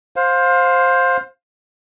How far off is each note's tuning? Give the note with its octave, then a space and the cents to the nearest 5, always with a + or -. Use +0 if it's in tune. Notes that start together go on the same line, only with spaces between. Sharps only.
C5 +5 F5 +25